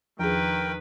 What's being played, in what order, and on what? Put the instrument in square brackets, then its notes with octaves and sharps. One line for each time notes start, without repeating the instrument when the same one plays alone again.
[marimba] E2 G#4 [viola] D#3 B4 [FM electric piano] F3 [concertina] A#4 G5